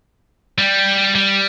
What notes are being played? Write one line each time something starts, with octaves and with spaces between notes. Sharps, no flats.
G3
G3